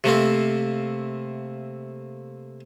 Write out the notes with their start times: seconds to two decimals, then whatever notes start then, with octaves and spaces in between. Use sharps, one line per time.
0.04 C3 A3 A#3 C4